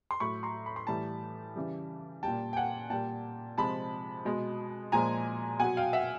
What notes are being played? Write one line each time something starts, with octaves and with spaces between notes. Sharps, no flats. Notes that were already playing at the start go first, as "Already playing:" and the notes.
C6
A2 F#3 B5 C#6
A#5 C6
B5
C6
A2 E3 G3 A5 B5
C#3 E3 G3
A#2 G3 G5 A5
G5
F#5 G#5
A#2 G3 G5 A5
C3 F3 G#3 A5 B5
B2 G#3
A#2 F3 G#3 G#5 A#5
B2 F#3 F#5 G#5
F5 G5
E5 F#5